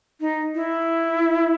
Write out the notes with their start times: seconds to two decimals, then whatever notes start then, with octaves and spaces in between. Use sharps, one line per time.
0.21 D#4
0.55 E4